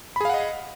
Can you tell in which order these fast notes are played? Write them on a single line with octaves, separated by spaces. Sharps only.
B5 G#4 F5 F#5 D#5